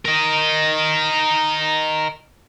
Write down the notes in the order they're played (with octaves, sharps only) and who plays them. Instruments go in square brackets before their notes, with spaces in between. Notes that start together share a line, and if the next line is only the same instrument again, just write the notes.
[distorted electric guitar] A#4 D#5